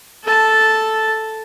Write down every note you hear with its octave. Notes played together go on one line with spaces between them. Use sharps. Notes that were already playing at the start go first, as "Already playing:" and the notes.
A4 A5